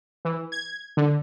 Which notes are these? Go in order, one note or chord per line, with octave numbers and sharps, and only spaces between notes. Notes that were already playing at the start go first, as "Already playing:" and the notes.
E3
G#6
D3